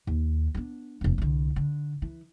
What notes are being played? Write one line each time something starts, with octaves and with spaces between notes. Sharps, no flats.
D#2
B3 D4
F1 D#2
C2 D3
D3
E3